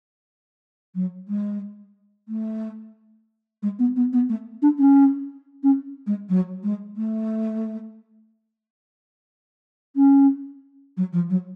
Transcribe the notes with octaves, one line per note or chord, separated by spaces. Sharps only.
F#3
G#3
A3
G#3
B3
B3
B3
A3
D4
C#4
C#4
G#3
F#3
G#3
A3
C#4
F#3
F3
F#3